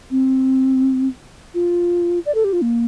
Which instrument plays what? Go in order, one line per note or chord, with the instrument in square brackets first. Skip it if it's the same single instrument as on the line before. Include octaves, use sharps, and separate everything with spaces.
[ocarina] C4
F4
D5
A4
G4
F4
A#3